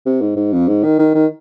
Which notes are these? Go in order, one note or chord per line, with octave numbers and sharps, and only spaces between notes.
C3
G#2
G#2
F2
G#2
D#3
D#3
D#3